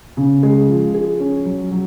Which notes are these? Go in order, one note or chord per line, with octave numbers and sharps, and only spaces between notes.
C#3
G#3
F3
G#4
C#4
F#3
F#3